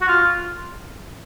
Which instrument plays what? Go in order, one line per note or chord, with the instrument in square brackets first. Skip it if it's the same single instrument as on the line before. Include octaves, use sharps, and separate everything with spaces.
[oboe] F#4
F4